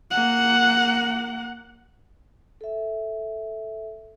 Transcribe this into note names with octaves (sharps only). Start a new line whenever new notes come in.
A#3 F#5
A4 E5